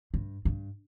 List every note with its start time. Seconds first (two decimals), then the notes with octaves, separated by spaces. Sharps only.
0.14 G2
0.45 G2